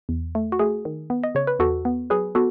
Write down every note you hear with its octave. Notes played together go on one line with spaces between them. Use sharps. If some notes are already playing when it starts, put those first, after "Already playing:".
E2
A3
F#4
A3 G#4
D#3
B3
D#5
C#3 C#5
B4
E2 F#4 A4
B3
F#3 G#4 B4
B3 F#4 A4